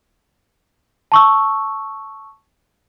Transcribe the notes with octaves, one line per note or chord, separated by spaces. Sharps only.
A5 C#6 E6